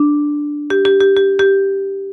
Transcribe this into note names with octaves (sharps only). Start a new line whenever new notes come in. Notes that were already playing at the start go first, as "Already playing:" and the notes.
Already playing: D4
G4
G4
G4
G4
G4